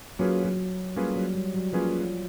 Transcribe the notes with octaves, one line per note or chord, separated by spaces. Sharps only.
F#3 A#3 C#4 F4 G#4 B4
F#3
G3 A#3 C#4 F4 G#4 B4
F#3
G3
F#3
F3 A#3 C#4 F4 G#4 B4